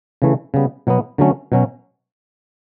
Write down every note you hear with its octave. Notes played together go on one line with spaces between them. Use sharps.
C#3 E3 A3
C#3 G3 B3
B2 F#3 B3
D3 F#3 A3 C#4
B2 F#3 C#4